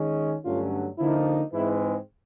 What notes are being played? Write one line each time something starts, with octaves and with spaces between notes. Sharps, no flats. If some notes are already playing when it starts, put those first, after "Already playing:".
Already playing: D#3 G#3 C#4
G2 D3 F#3 A3 C#4 F4
D3 F3 A#3 D#4 E4
G#2 E3 G#3 C4 E4